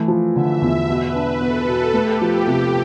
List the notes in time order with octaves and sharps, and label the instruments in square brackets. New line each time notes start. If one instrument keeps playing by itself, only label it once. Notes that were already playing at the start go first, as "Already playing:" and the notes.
Already playing: [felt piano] E3 A3
F3
[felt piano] D3 [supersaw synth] E5
[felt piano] E2
[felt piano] B2 [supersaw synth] B4
[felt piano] D4
[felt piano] B3 [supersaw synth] A4
[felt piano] B2
[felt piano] A3 [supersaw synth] G4
[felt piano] F3
C3